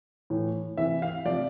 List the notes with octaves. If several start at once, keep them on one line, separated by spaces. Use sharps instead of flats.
A2 E3
C3 E3 E5
F5
C3 F3 D5